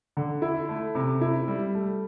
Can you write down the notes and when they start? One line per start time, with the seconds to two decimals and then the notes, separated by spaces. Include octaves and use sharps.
0.17 D3
0.42 E4
0.69 A3
0.95 C3
1.21 E4
1.48 G3
1.75 A3